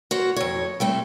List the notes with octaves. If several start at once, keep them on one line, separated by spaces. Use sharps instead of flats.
F#4 A#4 C5 C#5
F2 C#5
G3 A3 C4